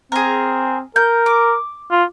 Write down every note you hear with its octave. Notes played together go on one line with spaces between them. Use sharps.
C4 G#4 A#4
A#4 G6
D6
F4